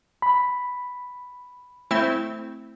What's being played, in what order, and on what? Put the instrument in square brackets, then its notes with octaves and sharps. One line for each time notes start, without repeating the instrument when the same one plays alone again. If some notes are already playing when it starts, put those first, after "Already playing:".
[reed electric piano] B5
[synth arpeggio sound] A3 C4 E4